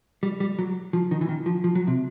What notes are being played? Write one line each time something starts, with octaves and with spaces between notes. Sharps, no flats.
G3
G3
F#3
F3
D#3
E3
D#3
F3
F3
F#3
C3